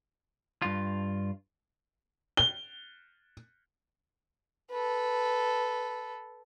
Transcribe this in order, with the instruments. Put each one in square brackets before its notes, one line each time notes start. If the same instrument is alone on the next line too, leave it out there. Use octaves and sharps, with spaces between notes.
[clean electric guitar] G2 F4
[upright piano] G7
[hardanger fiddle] A4 B4